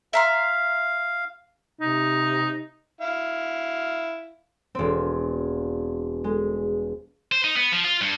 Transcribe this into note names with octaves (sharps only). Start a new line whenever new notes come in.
E5 F5 A#5 C6
C3 D#4
E4 F5
E1 C4
G#3
C5
D#4
B3
F3
F4
G2